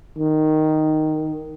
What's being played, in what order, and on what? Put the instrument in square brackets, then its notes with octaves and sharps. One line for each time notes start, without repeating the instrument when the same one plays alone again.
[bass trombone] D#3